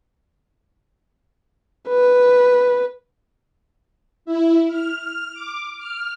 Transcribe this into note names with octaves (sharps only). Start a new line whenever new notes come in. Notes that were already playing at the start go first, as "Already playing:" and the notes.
B4
E4
F6
D6
F6